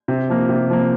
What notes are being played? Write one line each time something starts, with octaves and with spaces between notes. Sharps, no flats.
C3
F3 A#3
C3
F3 A#3